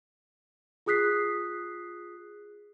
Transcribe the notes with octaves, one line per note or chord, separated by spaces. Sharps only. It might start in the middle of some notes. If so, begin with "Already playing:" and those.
F4 G#4 D#6 F#6 B6 C7